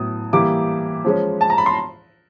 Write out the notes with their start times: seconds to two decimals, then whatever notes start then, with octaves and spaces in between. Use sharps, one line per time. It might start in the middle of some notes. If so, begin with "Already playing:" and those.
Already playing: A2 F#3 B3 D#6
0.33 E3 G3 A#3 D6
1.04 F3 G#3 C#4
1.41 A5
1.50 A#5
1.58 B5
1.66 C6